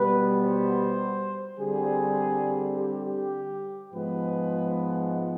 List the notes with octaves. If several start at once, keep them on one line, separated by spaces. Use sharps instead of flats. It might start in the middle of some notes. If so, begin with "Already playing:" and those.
Already playing: B2 G3 B3 B4
C5
D3 G3 C4 G#4
G4
G4
G#2 F3 G#3 B3 B4